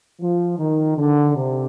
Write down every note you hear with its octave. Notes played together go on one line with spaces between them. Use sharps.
F3
D#3
D3
C3